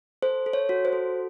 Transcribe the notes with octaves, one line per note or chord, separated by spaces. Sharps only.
A4 C5
A4
C#5
F#4
C5
A4